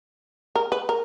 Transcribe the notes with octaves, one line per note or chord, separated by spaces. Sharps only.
A#4
B4
A#4